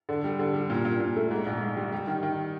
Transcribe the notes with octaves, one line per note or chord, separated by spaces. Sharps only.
D3
G3
D3
G3
A#2
A#2
A#2
A3
G#2
A#1
G#2
G3
G3
D#3
D#3